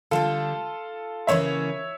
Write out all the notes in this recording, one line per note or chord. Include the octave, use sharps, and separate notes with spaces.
D3 G3 D4 F4 A4
C#3 E3 A#3 C#4 C#5 E5